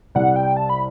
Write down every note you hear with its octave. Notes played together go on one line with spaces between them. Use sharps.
C2 C3 G3 F#5
G5
A5
B5